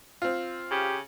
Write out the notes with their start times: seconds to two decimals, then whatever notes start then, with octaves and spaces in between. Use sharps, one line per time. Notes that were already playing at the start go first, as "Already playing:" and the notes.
0.22 C4 F4
0.71 C#3 G4